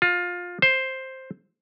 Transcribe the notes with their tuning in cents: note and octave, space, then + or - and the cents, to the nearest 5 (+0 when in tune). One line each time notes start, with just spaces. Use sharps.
F4 +20
C5 +5